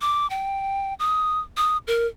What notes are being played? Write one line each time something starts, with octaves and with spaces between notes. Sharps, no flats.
D6
G5
D#6
D#6
A#4